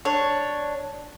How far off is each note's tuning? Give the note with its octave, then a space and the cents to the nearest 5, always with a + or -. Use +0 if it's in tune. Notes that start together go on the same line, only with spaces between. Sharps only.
D4 +0 C#5 +0